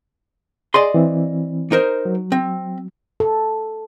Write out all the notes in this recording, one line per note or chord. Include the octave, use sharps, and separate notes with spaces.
G#4 D5 D#5 C6
E3 C4
D#4 A#4 C5
F#3
C4
A4